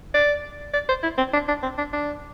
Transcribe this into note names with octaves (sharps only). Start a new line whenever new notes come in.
D5
D5
C5
E4
C4
D4
D4
C4
D4
D4